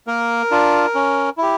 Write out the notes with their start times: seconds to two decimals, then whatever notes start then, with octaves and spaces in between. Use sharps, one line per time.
0.07 A#3 A#4
0.51 D4 F4
0.95 C#4
1.38 E4 G4